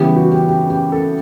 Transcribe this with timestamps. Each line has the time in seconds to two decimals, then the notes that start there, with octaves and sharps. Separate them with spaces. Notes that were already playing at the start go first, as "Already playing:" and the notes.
Already playing: C#3 E3 G3 B3 G4
0.16 F#4
0.32 G4
0.48 G4
0.70 G4
0.92 A4